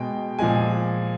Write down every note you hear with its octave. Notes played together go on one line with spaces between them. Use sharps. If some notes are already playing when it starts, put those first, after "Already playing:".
Already playing: B2 G#3 G5
A#2 F3 G#3 G#5